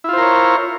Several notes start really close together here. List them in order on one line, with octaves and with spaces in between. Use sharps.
E4 F4 C5 A#4 C#5